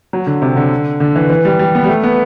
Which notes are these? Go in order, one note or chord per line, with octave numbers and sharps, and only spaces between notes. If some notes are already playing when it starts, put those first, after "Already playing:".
F#3
D3
C3
D3
D3
E3
E3
G3
G3
B3
G3
A3
B3